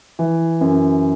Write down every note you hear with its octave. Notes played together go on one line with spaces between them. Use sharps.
E3
F#2